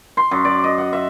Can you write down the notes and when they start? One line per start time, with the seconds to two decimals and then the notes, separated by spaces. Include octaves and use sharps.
0.17 C6
0.31 F#2
0.45 D5
0.64 D#5
0.78 F#5
0.93 E5